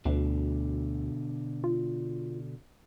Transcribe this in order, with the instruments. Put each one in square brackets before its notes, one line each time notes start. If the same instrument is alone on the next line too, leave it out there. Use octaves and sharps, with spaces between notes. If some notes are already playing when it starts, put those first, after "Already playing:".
[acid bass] D2 [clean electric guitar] B2 D3
[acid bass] F4